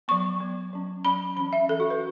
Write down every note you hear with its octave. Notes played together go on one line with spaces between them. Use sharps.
F#3 B3 C#6
F#3 B3
F#3 C#4
F#3 C#4 B5
E3 C#4 B5
E5
E3 C#4 A4
F#4
B4